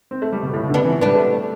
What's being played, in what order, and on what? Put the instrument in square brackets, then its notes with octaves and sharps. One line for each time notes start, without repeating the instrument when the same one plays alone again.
[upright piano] C4
A3
G3
B2
A2
B2
D3
[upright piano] C3 [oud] B3 D4
[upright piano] E3
[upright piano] G3 [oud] B3 D4
[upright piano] A3